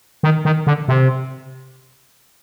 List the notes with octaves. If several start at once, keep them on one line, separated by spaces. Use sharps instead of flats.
D#3
D#3
D3
C3